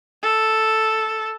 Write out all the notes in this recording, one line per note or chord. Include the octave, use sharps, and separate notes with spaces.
A4